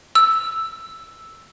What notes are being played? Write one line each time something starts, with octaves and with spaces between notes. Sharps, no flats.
E6